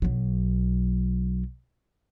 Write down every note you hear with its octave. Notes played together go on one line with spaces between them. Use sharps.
B1 F#3